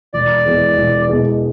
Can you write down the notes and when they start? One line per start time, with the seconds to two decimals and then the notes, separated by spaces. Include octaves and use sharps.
0.14 E1 D5
0.45 E2 B2 G#3
0.77 E1
1.08 E2 B2 G#3